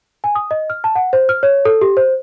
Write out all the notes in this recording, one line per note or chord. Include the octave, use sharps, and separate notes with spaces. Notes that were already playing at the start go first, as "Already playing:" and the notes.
G#5
D#6
D#5
F6
A5
F#5
C5
F6
C#5
A4
G4
C5